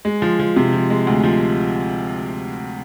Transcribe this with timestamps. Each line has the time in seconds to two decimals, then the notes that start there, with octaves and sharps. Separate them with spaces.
0.05 G#3
0.22 F3
0.39 F3
0.56 C3
0.73 F3
0.90 G#3
1.07 D2
1.24 F3